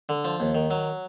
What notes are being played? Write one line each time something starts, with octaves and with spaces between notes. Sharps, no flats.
D3
F3
D#2
D#3
F#3